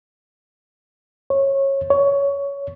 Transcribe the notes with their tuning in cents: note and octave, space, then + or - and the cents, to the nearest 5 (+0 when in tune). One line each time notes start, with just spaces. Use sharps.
C#5 -20
C#5 +15